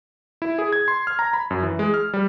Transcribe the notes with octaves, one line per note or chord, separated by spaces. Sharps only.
E4
G#4
G#6
C6
F6
A#5
B5
F#2
E3
G#3
F6
G3